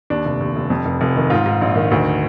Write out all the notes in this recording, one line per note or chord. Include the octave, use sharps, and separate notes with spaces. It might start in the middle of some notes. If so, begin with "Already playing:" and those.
D#2 D4
F1
D#2
F1
F2
F1
F1
D#3
G#2 F4
G#2
A#1
D#3
D2